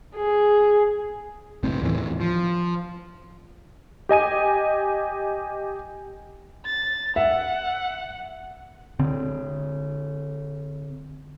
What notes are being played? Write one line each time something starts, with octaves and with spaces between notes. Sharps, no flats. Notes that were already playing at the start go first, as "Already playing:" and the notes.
G#4
F#1 B1 A2 C4
D#2 A2 E3
F3
G4 D#5 G#5 D#7
A6
E5 F#5
D3 C4